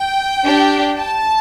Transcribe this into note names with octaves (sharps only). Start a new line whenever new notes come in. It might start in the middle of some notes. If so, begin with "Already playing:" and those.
Already playing: G5
D4 G4
A5